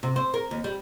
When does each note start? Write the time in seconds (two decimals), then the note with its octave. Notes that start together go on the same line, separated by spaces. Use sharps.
0.03 C3
0.16 C5
0.34 A#4
0.51 D#2
0.64 G3